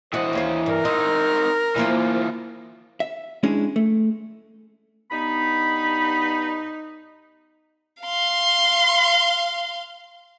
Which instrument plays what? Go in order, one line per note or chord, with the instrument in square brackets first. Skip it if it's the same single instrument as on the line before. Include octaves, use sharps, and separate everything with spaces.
[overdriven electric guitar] E3 D#5 [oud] F#4 [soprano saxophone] C5
[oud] D#2 C#4 F5
[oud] G2 [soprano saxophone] A#4
[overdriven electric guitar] C4 D#4 [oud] D#5
[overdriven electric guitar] E3 F4 [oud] F3 A#3 C5
[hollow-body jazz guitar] E5
G#3 C#4 D4 E4 G#4
A3
[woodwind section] G2 B3 B5 [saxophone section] D#4
[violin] F5 C6